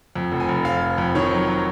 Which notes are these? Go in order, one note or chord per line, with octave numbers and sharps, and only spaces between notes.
F2
F1
G#5
F1
F1 F5
F1
F2
D#3 C#5
F#3
F#3